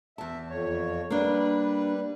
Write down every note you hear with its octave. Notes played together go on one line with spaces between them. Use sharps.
E2 E5 A5
F2 C#5
G3 A#3 D4 B4